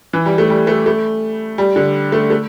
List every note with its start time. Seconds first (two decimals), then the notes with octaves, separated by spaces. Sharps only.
0.13 E3
0.26 G3
0.38 A3
0.50 G3
0.67 A3
0.86 A3
1.58 G3
1.76 D3
2.12 A3
2.30 A3